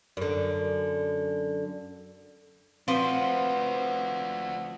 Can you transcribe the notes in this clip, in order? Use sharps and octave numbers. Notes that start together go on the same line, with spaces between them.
F#2 D3
F3 C4 D4 F#4 B4 C5 C6